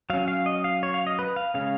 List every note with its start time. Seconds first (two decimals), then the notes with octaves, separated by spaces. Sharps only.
0.10 F#3 C#4 F5
0.28 F5
0.46 D#5
0.64 F5
0.83 C#5
0.94 F5
1.07 D#5
1.19 B4
1.36 F5
1.54 C#3 G#3 C#4 F5